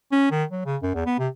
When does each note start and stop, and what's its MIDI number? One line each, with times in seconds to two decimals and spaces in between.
0.12 0.30 61
0.31 0.44 51
0.51 0.65 54
0.66 0.77 49
0.82 0.91 42
0.94 1.04 40
1.06 1.15 59
1.19 1.28 48